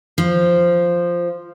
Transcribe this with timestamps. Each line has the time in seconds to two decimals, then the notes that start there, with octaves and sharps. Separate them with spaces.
0.18 F3